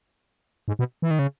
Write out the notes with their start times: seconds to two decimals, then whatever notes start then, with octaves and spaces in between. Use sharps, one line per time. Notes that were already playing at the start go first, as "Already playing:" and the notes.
0.68 G#2
0.79 B2
1.02 E3
1.11 D#3
1.19 C#3